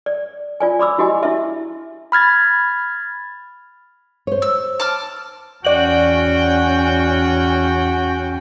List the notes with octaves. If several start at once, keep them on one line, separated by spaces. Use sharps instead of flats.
D5
F4 D5 G#5
D5 B5 D6 E6
E4 F#4 G4 D#5 G#5
E4 E5
B5 F6 G#6 A6
C5 C#5
E6
A5 D6 F6
E2 C#4 F#4 D5 G5 F#7